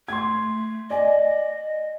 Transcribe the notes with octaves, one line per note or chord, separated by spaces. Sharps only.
A3 C6 G#6
D5 D#5 G#5